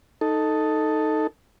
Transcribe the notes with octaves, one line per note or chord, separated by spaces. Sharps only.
D#4 A4